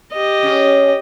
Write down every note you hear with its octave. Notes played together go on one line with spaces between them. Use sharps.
G4 D#5
C#4 G#4